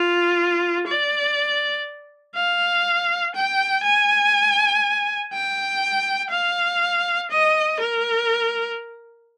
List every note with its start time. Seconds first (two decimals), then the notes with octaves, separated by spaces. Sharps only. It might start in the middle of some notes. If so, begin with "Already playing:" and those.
Already playing: F4
0.87 D5
2.35 F5
3.35 G5
3.84 G#5
5.33 G5
6.31 F5
7.30 D#5
7.80 A#4